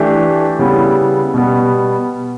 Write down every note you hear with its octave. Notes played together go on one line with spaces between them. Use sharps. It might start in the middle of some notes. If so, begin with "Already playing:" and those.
Already playing: E3 A3 D4 G4
C#3 G3 B3 E4
B2 G3 B3